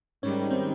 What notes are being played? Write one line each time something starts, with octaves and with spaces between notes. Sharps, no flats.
G#2 D#3 G3 C#4 C#5
C4 C5